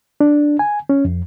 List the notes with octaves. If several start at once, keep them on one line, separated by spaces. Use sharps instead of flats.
D4
G#5
C#4
F2